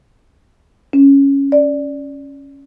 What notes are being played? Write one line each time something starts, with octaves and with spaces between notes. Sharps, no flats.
C#4
D5